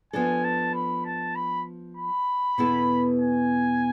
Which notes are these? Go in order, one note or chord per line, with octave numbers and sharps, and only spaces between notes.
F3 B3 D4 A4 G#5
A5
B5
A5
B5
B5
E2 B2 B3 E4 A4
G#5